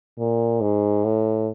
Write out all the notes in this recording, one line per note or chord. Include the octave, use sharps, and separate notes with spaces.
A#2
G#2
A2